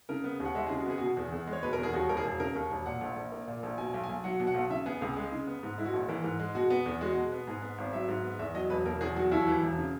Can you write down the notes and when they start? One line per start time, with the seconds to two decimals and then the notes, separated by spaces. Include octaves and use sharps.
0.09 C#3 A#4
0.24 B3
0.40 D#2
0.45 F#5
0.55 G#3 E5
0.67 G#4
0.70 C#3
0.78 F#4
0.86 B3 G#4
0.98 F#4
1.01 B2 G#4
1.17 E2
1.32 E2
1.47 G#3
1.53 C#5
1.63 B2 B4
1.73 A#4
1.78 E2
1.83 G#4
1.93 D#2 F#4
2.09 E1 A#4
2.17 G#4
2.24 E1
2.40 C#3 A#4
2.55 D#2
2.71 E1
2.86 A#2 F#5
3.01 A#1
3.16 A#1
3.32 A#3
3.47 A#2
3.63 A#1
3.78 B2 G#5
3.94 B1
4.04 G#5
4.09 B1
4.24 F#3 F#5
4.40 B2
4.47 F#5
4.54 B1
4.70 C#3 E5
4.86 B3 G#4
5.01 C#2 G#4
5.17 G#3
5.32 C#3
5.47 B3
5.63 G#2
5.78 G#3 E4
5.86 F#4
5.93 A#1
6.08 E3 A#4
6.24 G#2
6.39 G#3
6.55 B2 F#4
6.70 B3
6.86 E2
7.01 G#3 F#4
7.16 B2
7.32 B3
7.47 G#2 G#4
7.62 B3
7.78 G#1
7.93 F#3 E5
8.08 G#2
8.24 B3
8.39 E2 E5
8.54 F#3 D#5
8.70 E1 B4
8.85 B2 A#4
9.01 E2 G#4
9.16 F#3 F#4
9.31 D#2 E4
9.47 E3
9.62 E1
9.78 C#3